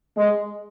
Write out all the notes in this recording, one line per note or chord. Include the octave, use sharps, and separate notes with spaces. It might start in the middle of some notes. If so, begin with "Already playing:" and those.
G#3